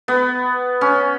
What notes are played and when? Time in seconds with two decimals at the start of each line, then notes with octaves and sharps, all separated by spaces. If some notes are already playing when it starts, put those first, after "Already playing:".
0.08 B3
0.81 C#4